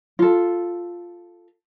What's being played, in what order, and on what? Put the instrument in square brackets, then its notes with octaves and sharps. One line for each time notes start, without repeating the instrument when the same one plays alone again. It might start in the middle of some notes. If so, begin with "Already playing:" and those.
[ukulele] F4 A4